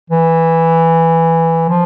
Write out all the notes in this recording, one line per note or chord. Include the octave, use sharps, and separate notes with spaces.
E3
F3